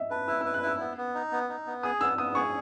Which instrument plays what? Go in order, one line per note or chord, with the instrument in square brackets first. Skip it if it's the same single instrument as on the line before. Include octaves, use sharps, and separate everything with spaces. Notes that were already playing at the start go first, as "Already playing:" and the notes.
Already playing: [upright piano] D#5 E5
[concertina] B4 [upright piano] A5
[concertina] E4 [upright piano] E6
[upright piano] E6
[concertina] B4
[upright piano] F#6
[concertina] E4 [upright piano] E6
[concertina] B3
B3
D#4
B3
D#4
B3
[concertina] G#4 [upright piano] D#6
[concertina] B3 [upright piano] E6
[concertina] B3 [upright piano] D#6
[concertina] G#4 [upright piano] C#6